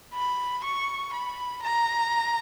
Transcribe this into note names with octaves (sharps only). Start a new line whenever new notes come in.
B5
C#6
B5
A#5